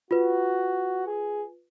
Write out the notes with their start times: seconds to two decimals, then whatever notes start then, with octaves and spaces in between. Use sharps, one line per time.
0.11 F4 F#4 B4
1.07 G#4